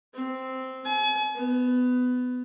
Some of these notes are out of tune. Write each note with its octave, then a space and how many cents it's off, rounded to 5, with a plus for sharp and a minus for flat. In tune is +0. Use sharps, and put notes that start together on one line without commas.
C4 -5
G#5 +40
B3 +20